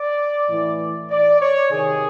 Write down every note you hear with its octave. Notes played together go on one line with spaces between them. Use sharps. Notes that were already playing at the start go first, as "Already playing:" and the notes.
Already playing: D5
A2 E3
D5
C#5
C3 D#3 G#4